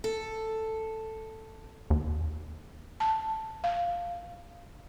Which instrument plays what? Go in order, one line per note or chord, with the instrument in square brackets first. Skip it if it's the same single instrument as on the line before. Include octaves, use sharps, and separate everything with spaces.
[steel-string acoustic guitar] A4
[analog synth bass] D#2
[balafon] A5
F5